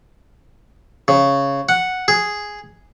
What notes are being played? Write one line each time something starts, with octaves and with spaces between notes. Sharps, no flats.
C#3
F#5
G#4